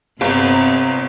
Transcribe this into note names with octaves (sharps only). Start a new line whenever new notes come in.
G1 C3 B3 C4 A#5